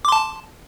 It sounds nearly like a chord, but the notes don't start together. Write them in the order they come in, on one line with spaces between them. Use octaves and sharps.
D6 C6 A5